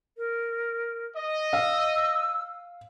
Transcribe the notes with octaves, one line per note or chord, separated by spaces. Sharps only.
A#4
D#5
F5 E6